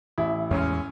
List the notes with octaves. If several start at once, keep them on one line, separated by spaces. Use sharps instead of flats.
A1 E4
E2 G#3 C#4